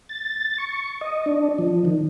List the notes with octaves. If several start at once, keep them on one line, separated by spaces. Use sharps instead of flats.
A6
C#6
D#5
D4
F3
D#3